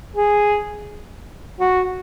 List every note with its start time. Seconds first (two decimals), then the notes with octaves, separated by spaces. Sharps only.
0.16 G#4
1.60 F#4